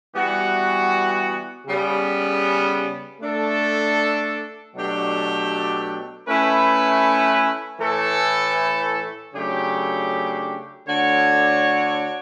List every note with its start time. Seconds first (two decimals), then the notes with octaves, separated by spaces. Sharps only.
0.14 E3 G3 B3 F#4
1.66 C#3 G3 B3
3.20 A3 D4 A4
4.74 B2 F#3 A3 D4 G4
6.28 A3 C#4 E4 B4
7.80 A2 E3 A3 E4 A4
9.35 C#3 F#3 A3 D4 G4
10.87 D3 A3 D4 F#4 C#5